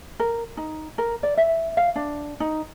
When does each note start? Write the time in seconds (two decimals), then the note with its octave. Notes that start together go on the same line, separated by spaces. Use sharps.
0.20 A#4
0.57 D#4
0.98 A#4
1.23 D5
1.37 E5
1.77 F5
1.96 D4
2.40 D#4